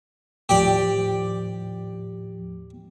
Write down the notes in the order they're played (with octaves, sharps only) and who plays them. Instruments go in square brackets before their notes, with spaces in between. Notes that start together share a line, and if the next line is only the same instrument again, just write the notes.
[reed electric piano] D#2 A2 F3 [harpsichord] G4 D5